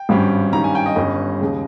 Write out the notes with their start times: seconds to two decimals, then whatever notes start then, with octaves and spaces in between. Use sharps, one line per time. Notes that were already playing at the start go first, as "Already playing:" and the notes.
Already playing: G5
0.09 G#1 G2 G3 C#4
0.53 G2 D#3 G3 C#4 A#5
0.64 G#5
0.75 G5
0.86 D#5
0.96 G1 G2 G3 C#4
1.41 D#2 C#3 G#3